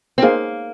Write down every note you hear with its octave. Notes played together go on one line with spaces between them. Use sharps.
C4
A#3 D#4 G#4 C5 F5